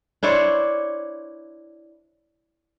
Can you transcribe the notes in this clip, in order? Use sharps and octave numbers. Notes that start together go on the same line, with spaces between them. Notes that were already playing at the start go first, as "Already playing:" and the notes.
D4 E4 C5 C#5